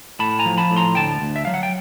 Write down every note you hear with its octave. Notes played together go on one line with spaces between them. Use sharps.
A2 A5 B5
G#5 A#5
F3
A5 B5
A2
A#5 C6
D2 G5 A5
D2
E5
F#3 F5
F#5
G5